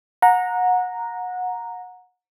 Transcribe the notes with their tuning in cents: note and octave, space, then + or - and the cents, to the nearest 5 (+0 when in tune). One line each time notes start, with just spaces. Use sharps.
F#5 -25 A#5 +0